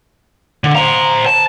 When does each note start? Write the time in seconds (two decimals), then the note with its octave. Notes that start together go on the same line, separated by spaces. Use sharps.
0.64 D3
0.75 C5 A#5
1.26 A5